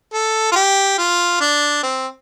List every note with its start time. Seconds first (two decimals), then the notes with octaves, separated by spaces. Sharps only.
0.14 A4
0.52 F4
0.56 G4
0.98 F4
1.41 D4
1.83 C4